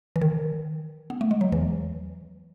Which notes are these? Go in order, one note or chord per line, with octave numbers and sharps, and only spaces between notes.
E3
D#3
B3
A3
G#3
F#3
E2 E3